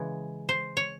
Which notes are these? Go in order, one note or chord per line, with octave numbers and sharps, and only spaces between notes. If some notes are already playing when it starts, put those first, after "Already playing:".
Already playing: C#3 E3 G#3
C5
C#5